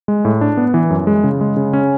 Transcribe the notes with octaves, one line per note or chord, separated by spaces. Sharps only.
G#3
A2
D4
B3
E3
F#2
G#3
C#3
G#3
C#3
C#4